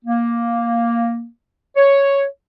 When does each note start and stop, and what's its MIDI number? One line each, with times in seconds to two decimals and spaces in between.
0.05 1.25 58
1.77 2.24 73